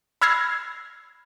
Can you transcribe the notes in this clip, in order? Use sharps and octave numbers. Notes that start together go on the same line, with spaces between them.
B5 E6 F6 G#6 A#6 C7